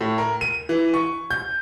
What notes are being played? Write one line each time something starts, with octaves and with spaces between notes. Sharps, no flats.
A2
A#4
D#7
E3
C#6
G6